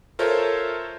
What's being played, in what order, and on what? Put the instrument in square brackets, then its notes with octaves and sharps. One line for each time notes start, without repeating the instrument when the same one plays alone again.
[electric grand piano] F4 A4 A#4 C5 C#5 E5